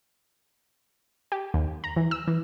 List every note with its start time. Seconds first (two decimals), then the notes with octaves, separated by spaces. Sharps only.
1.32 G4
1.54 D#2
1.84 A#5
1.96 E3
2.11 E6
2.27 E3